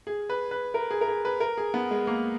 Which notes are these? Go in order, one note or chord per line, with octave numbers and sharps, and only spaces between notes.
G#4
B4
B4
A#4
G#4
A#4
G#4
B4
A#4
G#4
B3
G#3
A#3